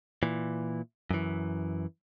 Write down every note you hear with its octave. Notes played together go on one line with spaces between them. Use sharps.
A#2 E3
F#2 E3